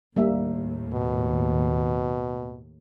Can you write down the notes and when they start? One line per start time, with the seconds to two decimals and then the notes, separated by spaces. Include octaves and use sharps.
0.16 D#2 A2 G3 A#3 E5
0.93 B2